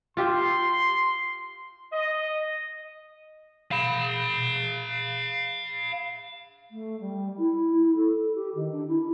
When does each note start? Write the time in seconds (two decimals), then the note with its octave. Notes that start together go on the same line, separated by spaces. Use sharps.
0.17 F4 G4 E5 C6
1.92 D#5
3.71 F5 B5
6.71 A3
7.00 G3
7.37 E4
7.80 E4
7.96 A4
8.35 G4
8.55 D#3
8.71 D4
8.87 E4